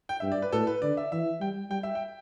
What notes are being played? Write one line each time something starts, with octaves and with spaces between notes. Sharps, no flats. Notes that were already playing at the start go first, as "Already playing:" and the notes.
G5
G2 E5
D5
B4
A2 A4
B4
D3 D5
E5
E3 E5
G3 G5
G3 G5
E5
G5